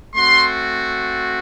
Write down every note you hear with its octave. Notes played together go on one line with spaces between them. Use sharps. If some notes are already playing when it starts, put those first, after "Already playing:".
A3 C4 F#4 C6